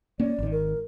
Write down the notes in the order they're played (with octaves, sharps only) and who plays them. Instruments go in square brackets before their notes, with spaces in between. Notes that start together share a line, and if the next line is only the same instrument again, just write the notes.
[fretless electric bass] A#3 C#4 [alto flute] D5
[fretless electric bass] G#1 D#3
[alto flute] A#4